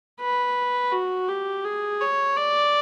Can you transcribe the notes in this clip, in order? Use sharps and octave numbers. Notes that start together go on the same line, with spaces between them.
B4
F#4
G4
G#4
C#5
D5